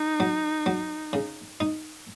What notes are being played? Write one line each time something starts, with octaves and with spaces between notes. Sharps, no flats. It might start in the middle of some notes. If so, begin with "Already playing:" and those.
Already playing: D#4
F#3
F#3
C#3
D#4